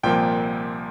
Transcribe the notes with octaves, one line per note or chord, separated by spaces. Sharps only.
C2 A#2 F3 A#3 G5